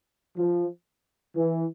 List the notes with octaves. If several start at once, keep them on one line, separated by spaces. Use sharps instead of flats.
F3
E3